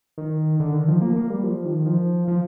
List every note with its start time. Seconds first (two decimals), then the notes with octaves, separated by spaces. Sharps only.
0.18 D#3
0.60 D3
0.74 D#3
0.88 F3
1.02 A#3
1.16 A#3
1.30 G3
1.43 F3
1.65 D#3
1.86 F3
2.28 F3